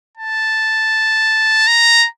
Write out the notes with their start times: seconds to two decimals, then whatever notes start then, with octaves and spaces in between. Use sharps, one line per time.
0.17 A5
1.67 A#5